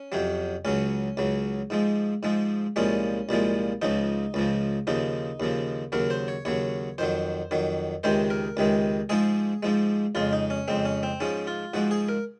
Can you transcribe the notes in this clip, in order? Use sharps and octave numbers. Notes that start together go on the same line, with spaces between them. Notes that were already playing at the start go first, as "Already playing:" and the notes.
Already playing: C#4
F2 C3 F#3
C#2 C#3 F#3 C#4
C#2 C#3 F#3
G#2 F3 G#3
G#2 F3 G#3
C2 A#2 F3 G#3 C#4
C2 A#2 F3 G#3
C#2 C#3 F3 D#4
C#2 C#3 F3
D#2 C#3 F3 D#4
D#2 C#3 F3
D#2 C#3 F#3 A#4
C5
C#5
D#2 C#3 F#3 C#5
F2 D#3 F#3 C5
F2 D#3 F#3
C#2 C3 D#3 G#3 C5
A#4
C#2 C3 D#3 G#3
G#2 F3 G#3 G#4
G#2 F3 G#3
F2 C#3 G#3 F4
D#4
C#4
F2 C#3 G#3 C4
C#4
C4
G#2 F3 G#3 C#4
F4
G#2 F3 G#3 F#4
G#4
A#4